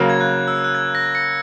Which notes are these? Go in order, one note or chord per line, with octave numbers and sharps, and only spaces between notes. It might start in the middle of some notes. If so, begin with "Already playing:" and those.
Already playing: C#3 F#3 A#3
G#6
F#6
E6
F#6
G#6
A#6
A#6 C#7